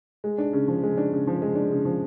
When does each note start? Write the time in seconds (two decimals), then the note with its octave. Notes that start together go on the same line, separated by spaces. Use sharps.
0.24 G#3
0.38 D4
0.53 C#3
0.68 F3
0.83 G#3
0.97 D4
1.12 C#3
1.27 F3
1.42 G#3
1.55 D4
1.71 C#3
1.85 F3